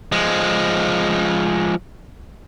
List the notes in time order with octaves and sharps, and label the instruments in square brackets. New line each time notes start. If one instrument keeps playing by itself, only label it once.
[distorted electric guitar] F3 G#3